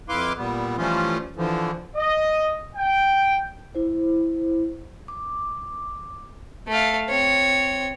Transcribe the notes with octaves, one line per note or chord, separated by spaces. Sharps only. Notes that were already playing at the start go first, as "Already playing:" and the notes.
F2 E4 B4 F5 C6 D6
A#2 G3 B3
E3 F3 G3 A3 C#4 F4
D3 E3 F3
D#5
G5
E4 C5
D6
A3 F5
C4 C#5